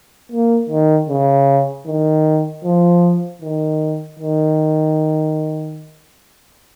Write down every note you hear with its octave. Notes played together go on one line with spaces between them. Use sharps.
A#3
D#3
C#3
D#3
F3
D#3
D#3